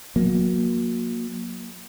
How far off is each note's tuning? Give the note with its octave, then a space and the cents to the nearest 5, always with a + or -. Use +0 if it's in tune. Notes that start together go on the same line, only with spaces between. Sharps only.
F#3 -35 A#3 +10